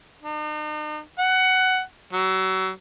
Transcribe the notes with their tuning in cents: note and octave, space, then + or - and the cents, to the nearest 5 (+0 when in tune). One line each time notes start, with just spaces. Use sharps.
D#4 -45
F#5 +15
F#3 +35